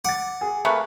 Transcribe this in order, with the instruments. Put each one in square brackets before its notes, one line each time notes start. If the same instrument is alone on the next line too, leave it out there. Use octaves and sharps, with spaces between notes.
[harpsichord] F#5 [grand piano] D6 A6
[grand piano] G#4
[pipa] A3 A#3 B4 [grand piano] G#4 C#6 F#6